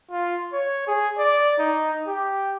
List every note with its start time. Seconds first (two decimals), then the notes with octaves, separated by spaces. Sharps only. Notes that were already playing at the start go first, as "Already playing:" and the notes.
0.11 F4
0.53 C#5
0.88 G#4
1.18 D5
1.59 D#4
2.08 G4